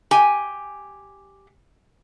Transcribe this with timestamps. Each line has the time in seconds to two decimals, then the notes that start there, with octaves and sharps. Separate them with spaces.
0.11 G4 G#5